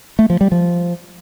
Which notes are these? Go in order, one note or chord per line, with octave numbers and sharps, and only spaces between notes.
A3
F3
G3
F3